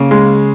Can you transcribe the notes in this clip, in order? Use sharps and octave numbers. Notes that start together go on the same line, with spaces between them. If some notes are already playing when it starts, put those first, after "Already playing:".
Already playing: C#3 A#3
G#3